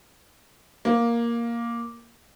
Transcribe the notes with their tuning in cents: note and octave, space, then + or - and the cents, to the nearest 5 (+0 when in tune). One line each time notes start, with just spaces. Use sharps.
A#3 +5